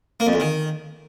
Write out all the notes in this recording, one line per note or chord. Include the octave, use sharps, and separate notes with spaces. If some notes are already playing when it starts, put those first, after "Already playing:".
A#3
F2
E2
D#3